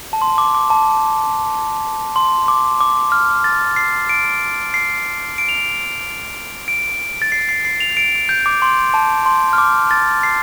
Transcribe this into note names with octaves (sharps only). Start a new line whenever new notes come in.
A5
C6
D6
D6
A5
C6
D6
D6
F6
A6
C7
D7
C7
D7
F7
D7
D7
A6
C7
C7
C7
F7
D7
G6
D6
C6
A5
C6
F6
D6
A6
C7